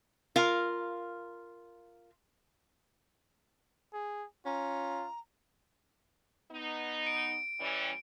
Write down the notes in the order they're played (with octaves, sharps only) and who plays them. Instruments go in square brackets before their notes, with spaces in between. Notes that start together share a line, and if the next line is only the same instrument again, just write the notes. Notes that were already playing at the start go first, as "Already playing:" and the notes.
[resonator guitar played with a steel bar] F4 A#4 F5
[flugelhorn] G#4
[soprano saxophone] C#4 [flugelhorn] F4 [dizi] A#5
[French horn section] B3 D#4
[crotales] D7
[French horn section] E3 G3 C#4